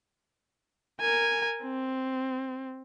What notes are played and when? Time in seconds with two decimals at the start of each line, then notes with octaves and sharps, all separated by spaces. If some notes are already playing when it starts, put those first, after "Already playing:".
1.01 A#4 G#5
1.63 C4